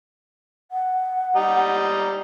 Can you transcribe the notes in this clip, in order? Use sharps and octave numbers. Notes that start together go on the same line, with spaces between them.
F#5
G3 D#5 A#5